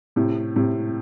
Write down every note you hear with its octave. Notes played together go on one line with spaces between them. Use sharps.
A2 C3
A2 C3